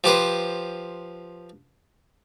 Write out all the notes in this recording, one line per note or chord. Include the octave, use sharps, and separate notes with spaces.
F3 G4 B4 C5